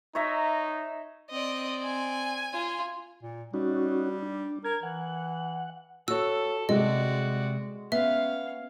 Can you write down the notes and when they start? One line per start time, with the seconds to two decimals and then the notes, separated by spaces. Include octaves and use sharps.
0.15 D#4 C#5 E5 A#5
1.31 C4 D5 D#5
1.83 G#5
2.53 F4
3.23 A#2
3.54 G3 C#4 D#4 F#4
4.22 D4
4.64 A#4 G#6
4.83 E3 F#5
6.08 F#4 A4 C#5 E6
6.69 C3 G3 G#3 F#4 D5 D#5
7.92 B3 C#4 E5 F5